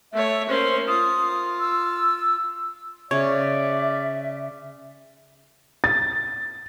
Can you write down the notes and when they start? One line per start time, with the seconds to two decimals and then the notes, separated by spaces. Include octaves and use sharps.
0.13 A3 C#5 E5
0.49 A#3 C#4 C5
0.88 F4 D#6
1.60 E6
3.11 C#3 C#5 D5 E5
5.84 A6